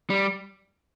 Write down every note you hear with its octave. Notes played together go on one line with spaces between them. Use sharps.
G3